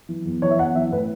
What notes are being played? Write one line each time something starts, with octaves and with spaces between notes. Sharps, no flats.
E3
E2
E3 C#5
E5
E2 F#5
E3 E5
A2 B4